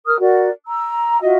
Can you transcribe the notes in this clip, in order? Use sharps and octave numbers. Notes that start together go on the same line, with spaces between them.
A#4 D#6 F6
F#4 A#4 D5
A#5 E6
F4 F#4 D#5 E5